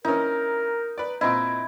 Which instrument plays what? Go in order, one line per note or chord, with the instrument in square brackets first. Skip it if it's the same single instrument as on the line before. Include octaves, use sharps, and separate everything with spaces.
[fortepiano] C#4 E4 [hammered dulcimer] D#4 [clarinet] A#4
[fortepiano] B4 D5
[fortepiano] A#2 C4 D#5 [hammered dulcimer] E4